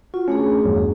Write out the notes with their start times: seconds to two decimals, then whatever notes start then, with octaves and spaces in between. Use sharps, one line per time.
0.14 F4 F#4
0.28 A3 C#4 D4 G#4
0.65 E2 G2 F#3